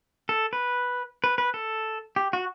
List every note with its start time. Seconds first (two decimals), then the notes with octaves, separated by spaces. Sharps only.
0.29 A4
0.53 B4
1.24 B4
1.38 B4
1.54 A4
2.16 G4
2.33 F#4